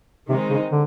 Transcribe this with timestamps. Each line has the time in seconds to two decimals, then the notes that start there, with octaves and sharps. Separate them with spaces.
0.29 C3 D#3 G#3 C4 D#4
0.50 C#3
0.71 D3